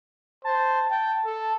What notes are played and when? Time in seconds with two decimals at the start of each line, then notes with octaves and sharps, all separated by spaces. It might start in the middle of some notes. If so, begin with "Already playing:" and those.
0.44 C5 A5
0.90 G5 A5
1.25 A4